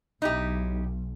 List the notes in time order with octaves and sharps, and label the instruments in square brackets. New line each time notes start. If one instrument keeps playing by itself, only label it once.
[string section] B1 [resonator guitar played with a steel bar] D#4 E4 G4